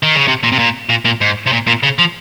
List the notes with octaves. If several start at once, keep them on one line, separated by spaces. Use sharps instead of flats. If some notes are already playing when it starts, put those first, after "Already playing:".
D#3
C#3
C3
A#2
C3
A#2
A#2
A#2
G#2
C3
A#2
A#2
C#3
F3